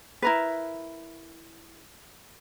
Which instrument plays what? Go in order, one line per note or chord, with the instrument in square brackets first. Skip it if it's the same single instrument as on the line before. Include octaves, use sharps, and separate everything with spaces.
[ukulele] E4 A#4 B4